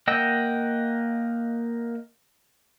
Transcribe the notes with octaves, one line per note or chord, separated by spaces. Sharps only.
A#3 D#5 F#5 G5 E6